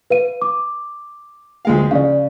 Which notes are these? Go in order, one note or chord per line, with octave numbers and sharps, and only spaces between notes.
B4 F5 D#7
D6
D2 G#3 F5
C#3 D5 F5